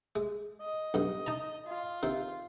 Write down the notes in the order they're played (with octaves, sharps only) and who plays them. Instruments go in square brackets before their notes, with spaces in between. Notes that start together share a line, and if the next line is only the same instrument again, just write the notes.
[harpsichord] G#3
[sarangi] D#5
[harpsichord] B1 G2
D#4 A5 A#5
[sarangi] F4
[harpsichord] C3 D#3